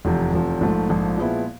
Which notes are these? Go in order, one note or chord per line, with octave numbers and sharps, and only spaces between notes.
F1 E2 C3 F3
F1 E2 C3 F3
A#1 G#2 F3 A3
A#1 G#2 F3 A3
A#2 F3 G#3 B3 E4